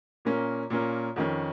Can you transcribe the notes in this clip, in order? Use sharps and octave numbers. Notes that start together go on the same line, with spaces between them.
A#2 A#3 C#4 A#4
A#2 A#3 C#4 A#4
F2 D#3 C#4